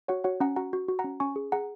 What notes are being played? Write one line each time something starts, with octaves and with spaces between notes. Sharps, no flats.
F#4 C#5 F#5
F#4 C#5 F#5
C#4 F#5 A#5
F#4 F#5 A#5
F#4
F#4
F#5 A#5
C#4
C#4 G#5 C#6
G#4
G#4 F#5 A#5